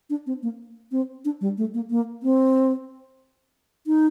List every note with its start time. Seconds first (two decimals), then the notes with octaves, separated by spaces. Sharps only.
0.10 D4
0.26 C4
0.43 A#3
0.92 C4
1.25 D4
1.41 G3
1.58 A3
1.74 A#3
1.90 A#3
2.23 C4
3.87 D#4